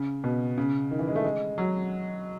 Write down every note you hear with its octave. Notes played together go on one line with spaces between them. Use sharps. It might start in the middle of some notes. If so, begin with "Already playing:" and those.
Already playing: C#3
B2
C#3
D#3
E3
G#3
A3
G#3
F#3